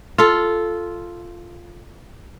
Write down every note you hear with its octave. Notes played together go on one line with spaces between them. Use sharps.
F4 A4